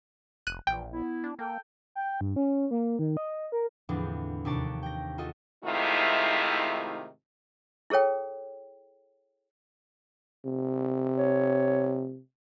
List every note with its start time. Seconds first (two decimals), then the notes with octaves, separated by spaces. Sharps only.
0.47 F1 F#6 D#7
0.67 A#1 A#2 E3 G5
0.91 B3 E4
1.24 D4
1.39 A#3 A4 G5
1.95 G5
2.21 G2
2.36 C#4
2.71 A#3
2.99 D#3
3.17 D#5
3.52 A#4
3.89 E2 A2 D3 F3 C4 D4
4.45 D#2 C3 D4 D5 A5 C#6
4.83 G5 A#6
5.18 F4 F#4 A4 D#5
5.64 G#2 C3 D#3 A3 E4 F4
7.90 E4 G#4 A4 C#5 G5
10.45 C3
11.18 C#5